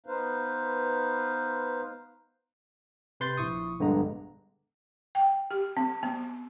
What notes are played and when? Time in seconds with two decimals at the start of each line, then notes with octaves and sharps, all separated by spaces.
0.06 B3 D#4 B4 C5 F5
3.20 C3 B4 C6 G6 A6 C7
3.37 A#1 E4 C#6 D#6
3.79 A#1 G2 D3 G#3 B3 A#5
5.15 G5
5.51 G4
5.77 C4
6.03 B3